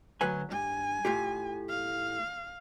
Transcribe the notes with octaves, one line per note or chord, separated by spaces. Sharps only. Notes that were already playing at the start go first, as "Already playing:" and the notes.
D2 F#3 B4 G#5
G2 G#5
A2 F4 G4
F5